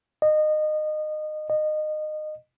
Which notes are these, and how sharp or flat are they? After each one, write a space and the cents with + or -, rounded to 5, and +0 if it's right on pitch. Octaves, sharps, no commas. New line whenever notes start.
D#5 -25
D#5 -25